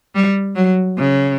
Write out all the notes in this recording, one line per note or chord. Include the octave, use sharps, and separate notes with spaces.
G3
F#3
C#3